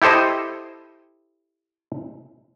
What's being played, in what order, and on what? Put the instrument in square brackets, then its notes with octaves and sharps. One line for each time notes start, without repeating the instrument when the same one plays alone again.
[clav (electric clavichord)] E4 G4 A4 C5 D#5